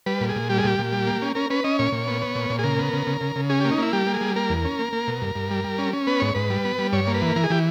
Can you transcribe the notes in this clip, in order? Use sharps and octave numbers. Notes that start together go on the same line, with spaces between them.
G3 B4
A#2
G#4
A#2
G3 G4
G#4
A#2 G4
A#2
G3
A#3
C#4
C#4 A#4
C#4 B4
C#4 D#5
A#2 C#5
A#2
B3
B3
A#2
A#2
G#4
C#3 A#4
B3
C#3
C#3
C#3
C#3
C#4 G#4
A#3 G4
D#4
A#3 E4
G3 G4
A#3
G#4
G3
A#3 A#4
E2
C#4
A#3
A#3
B2
G2
G2
G3
G3
C#4
C#4
B3 B4
G#2 C#5
G#2 B4
G3
B3
G3
G2 C#5
A#3
B4
E3
E3 A#4
G#4
E3 G4